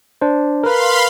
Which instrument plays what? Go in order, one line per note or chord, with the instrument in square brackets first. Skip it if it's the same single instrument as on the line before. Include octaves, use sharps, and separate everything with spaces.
[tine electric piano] D4 C5
[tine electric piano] A#4 B4 [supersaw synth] F5 B5 C6